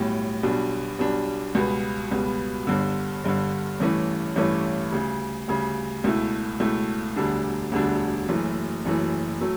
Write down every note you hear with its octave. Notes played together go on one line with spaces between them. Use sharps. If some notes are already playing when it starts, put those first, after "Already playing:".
Already playing: B1 A2 G3
B1 B2 G3 D4
B1 B2 G3 D4
C#2 B2 G3 B3
C#2 B2 G3 B3
G1 G2 D3
G1 G2 D3
A1 G2 E3 A3 C#4
A1 G2 E3 A3 C#4
D2 C#3 G3
D2 C#3 G3
C#2 B2 A3 E4
C#2 B2 A3 E4
E1 D2 D3 G3 D4
E1 D2 D3 G3 D4
F#1 F#2 E3 A3
F#1 F#2 E3 A3
F#3 A3